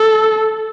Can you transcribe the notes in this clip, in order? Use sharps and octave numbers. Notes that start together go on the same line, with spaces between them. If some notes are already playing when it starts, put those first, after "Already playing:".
Already playing: A4